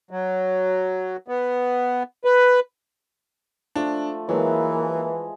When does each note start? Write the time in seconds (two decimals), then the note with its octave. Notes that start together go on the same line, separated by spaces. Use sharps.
0.11 F#3
1.28 B3
2.25 B4
3.75 F3 A3 D4
4.29 E3 F#3 G#3 A#3